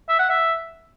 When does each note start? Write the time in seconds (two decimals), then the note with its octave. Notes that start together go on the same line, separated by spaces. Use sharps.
0.09 E5
0.19 F#5
0.29 E5